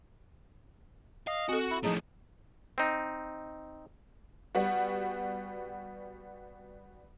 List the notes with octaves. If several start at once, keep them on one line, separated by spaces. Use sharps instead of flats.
D#5 F5
C4 F#4 A4
E4
A2 F3 D#4 G#4
C4 D#4
G3 B3 F#4